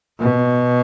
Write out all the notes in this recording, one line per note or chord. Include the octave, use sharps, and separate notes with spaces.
B2